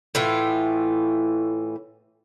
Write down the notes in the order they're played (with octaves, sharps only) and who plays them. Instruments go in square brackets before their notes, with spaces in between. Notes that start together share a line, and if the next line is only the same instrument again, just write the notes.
[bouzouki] A2 E3 F4